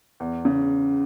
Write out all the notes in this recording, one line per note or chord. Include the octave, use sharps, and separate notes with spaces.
E2
C#3